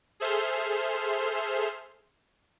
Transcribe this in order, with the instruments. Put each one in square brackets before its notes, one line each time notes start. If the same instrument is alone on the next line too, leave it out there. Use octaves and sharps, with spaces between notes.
[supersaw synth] G#4 A4 C5 E5 C6 F6